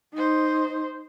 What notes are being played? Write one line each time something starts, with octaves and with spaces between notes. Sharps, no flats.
D#4 C5